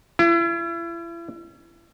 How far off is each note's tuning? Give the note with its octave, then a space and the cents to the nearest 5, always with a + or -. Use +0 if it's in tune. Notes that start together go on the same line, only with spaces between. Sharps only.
E4 +40